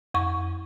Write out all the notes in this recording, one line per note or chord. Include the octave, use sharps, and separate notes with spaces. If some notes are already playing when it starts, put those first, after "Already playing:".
F2 C#6